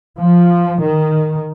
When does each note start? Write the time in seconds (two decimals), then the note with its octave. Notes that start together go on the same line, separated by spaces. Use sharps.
0.19 F3
0.81 D#3